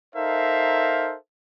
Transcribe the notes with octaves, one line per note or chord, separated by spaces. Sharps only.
D#4 A4 A#4 C5 E5 F5